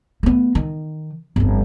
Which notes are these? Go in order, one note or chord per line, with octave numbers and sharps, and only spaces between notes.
A3 B3
D#3
G1 F2